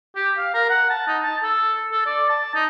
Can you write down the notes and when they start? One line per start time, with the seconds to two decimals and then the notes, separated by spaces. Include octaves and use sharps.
0.16 G4
0.37 F5
0.54 A#4
0.69 F#5
0.89 A5
1.07 D#4
1.24 A5
1.43 A4
1.92 A4
2.06 D5
2.29 A5
2.55 D#4